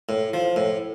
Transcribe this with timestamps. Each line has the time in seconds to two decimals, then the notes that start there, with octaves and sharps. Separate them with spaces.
0.09 A2
0.33 F3
0.56 A2